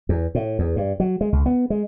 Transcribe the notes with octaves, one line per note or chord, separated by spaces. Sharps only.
E2
A2
E2
G2
F#3
G#3
C#2
B3
G#3